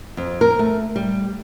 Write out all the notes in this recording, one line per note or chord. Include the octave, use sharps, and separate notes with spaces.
F2
A#4
A3
G3